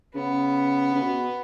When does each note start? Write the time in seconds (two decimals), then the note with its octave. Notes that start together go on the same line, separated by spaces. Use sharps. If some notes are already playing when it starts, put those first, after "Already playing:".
0.15 C#3 B3
0.94 C#3
1.02 B2